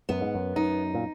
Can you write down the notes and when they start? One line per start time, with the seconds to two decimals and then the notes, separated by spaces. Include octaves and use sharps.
0.09 F#2 B3
0.21 G#2
0.35 F#2
0.56 F#2 D#4
0.95 A#2